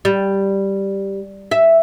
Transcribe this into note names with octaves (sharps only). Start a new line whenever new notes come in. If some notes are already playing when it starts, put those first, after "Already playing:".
G3
E5